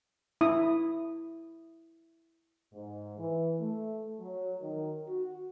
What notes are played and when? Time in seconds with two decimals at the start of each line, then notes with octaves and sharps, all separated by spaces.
0.41 E4 D#6
2.73 G#2
3.17 E3
3.59 A3
4.20 F#3
4.61 D#3
5.07 F#4